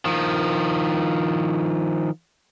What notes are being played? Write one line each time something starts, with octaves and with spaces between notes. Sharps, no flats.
D#3 F3